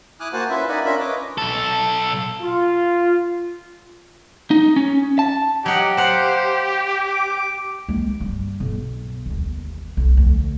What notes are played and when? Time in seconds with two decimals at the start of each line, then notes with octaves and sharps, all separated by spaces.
0.20 E4 G#5 D6 D#6 F6 F#6
0.33 A#3 F#4 C5 F#5 G#5 A5
0.50 C#4 E4 F4 B4 E5
0.68 D#4 A#4 D5 F#5 G#5 B5
0.85 C#4 D4 F4 A#4 E5 B5
1.00 B4 C#5 D#5 D6
1.38 B1 A4
2.42 F4
4.51 D#4
4.76 C#4
5.19 A5
5.66 F#3 G4 D#5 F#5
5.97 C5 F5 F#5 A5
7.04 D6
7.89 G#3 A#3
8.21 G2
8.60 B1
9.26 G1 D#2
9.97 B1
10.17 D2 F3